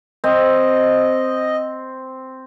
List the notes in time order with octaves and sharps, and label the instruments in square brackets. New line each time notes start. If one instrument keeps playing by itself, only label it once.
[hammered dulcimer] C4 [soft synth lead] D#5